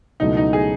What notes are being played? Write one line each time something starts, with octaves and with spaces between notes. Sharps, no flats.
C#2 B2 F#3 A3 D#4 E4
D#4
G#4